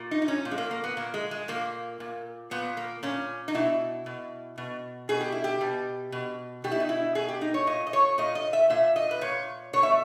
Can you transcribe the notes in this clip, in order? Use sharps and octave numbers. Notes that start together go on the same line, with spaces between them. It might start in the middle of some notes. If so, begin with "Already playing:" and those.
Already playing: A#2
D#4
D#4
C#4
A#2
G#3
A#3
A#3
B3
A#2 A#3
G#3
G#3
A#2 A#3
A#2
A#2 B3
A#3
A#2 C#4
D#4
B2 E4
B2
B2
B2 G#4
G4
E4
G4
B2
B2
B2 G4
E4
D#4
E4
B2 G#4
G4
D#4
C#5
A#2 D#5
D#5
C#5
A#2 D#5
D#5
E5
A#2 E5
D#5
B4
A#2 C#5
B2 C#5
E5